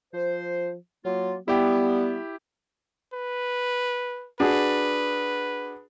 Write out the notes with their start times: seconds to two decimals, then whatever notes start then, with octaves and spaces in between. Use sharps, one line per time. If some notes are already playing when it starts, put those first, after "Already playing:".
0.14 F3 C5
1.05 F#3 A#3 F4
1.48 G3 B3 E4 G4 G5
3.13 B4
4.40 D4 F#4 G#4 B4